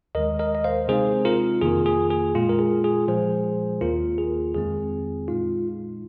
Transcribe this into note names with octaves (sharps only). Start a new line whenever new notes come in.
D#2 D#3 G#3 A#4 D#5
A#4 D#5
D#5
C5 F5
C3 G#3 C4 D#4 G#4 C5
F4 A#4
F2 D#3 A#3 F4 G#4
G#4
G#4
A#2 G#3 F4
A#4
G#4
G#4
A#2 F3 G#3 G#4 C5
D#2 D#3 A#3 F4 A#4
G#4
F2 D#3 G#3 C4 G#4
A#2 G#3 D#4 F4